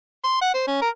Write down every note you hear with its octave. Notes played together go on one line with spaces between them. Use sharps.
C6
F#5
C5
C#4
A#4